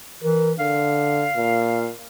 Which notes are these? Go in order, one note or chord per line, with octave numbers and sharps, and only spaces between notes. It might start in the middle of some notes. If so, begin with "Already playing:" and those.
E3 A#4
D3 F5
A#2